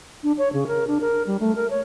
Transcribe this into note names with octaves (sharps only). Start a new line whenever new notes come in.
D4
C#5
C#3
A#4
D4
A#4
G3
A3
A#4
C#5